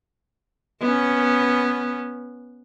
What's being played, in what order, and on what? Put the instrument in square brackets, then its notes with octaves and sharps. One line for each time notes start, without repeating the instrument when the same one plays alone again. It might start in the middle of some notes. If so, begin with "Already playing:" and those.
[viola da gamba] B3 C#4